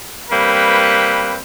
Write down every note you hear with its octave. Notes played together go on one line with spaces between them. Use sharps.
G3 A#3 C4 B4